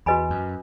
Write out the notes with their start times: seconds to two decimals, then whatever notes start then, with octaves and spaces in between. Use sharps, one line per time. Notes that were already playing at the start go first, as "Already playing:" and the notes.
0.06 E2 F#4 B4 D#5 G#5 B5
0.30 F#2